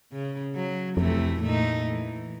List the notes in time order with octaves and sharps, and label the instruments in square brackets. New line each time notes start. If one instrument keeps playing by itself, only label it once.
[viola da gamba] C#3
F#3
[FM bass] F2 [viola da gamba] C3 E3 A3
[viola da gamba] A#2 A3 D#4
E3